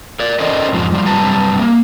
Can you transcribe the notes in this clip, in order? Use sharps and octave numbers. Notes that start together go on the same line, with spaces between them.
A#4 D5
C#4 A4 A#4 C5 D5 D#5
F2 G#2 F3
F3 G3
F#2 C3 G3 B4 A5 A#5
A#3